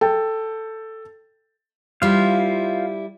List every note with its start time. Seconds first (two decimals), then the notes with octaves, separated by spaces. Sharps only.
0.01 A4 G5
2.02 G3 E4 F4 C5 F5